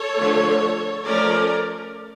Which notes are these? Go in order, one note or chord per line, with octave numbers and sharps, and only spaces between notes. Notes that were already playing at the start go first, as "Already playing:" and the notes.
Already playing: A4 C#5
D3 F3 A3
F3 A3 C#4 A#4 D5